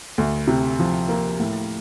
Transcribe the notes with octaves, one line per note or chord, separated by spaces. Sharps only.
D2
C3
F3
A#3
A2